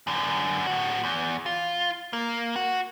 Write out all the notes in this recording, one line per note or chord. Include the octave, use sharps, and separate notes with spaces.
F#2 D3
A2 F#4
E2
F4
A#3
F#4